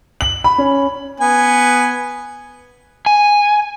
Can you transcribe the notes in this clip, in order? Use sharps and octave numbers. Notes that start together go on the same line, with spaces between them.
F#7
B5
C#4
B3 G#5
G#5